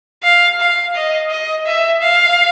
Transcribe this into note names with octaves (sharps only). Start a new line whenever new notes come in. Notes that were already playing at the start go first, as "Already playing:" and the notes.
F5
F5
D#5
D#5
E5
F5